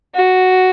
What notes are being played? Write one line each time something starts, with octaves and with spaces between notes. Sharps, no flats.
F#4